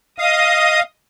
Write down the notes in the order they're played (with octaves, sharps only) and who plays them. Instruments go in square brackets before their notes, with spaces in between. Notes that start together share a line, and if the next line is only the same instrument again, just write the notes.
[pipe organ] D#5 D#6 [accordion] F5